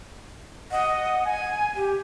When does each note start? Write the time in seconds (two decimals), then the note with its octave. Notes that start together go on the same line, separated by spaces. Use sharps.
0.71 D#5 F#5
1.25 G#5
1.75 G4